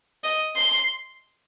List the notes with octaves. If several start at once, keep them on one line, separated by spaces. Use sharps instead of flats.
D#5
C6